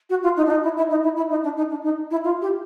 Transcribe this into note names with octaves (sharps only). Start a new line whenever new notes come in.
F#4
F4
D#4
D4
D#4
E4
E4
D#4
E4
E4
D#4
D4
D#4
D4
D#4
E4
F4
G4